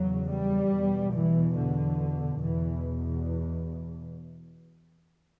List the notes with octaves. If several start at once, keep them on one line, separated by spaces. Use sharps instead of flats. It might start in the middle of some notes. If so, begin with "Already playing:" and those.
Already playing: E2 C#3 F#3
G3
E2 B2
E3
D3
E2 B2 E3